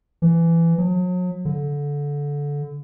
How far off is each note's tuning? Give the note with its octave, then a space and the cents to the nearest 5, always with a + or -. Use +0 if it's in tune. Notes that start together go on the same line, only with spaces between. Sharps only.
E3 +20
F#3 -40
D3 -20